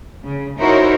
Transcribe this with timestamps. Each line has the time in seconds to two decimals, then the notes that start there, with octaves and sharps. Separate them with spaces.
0.24 C#3
0.60 D#4 E4 F#4 A#4 C5 C#5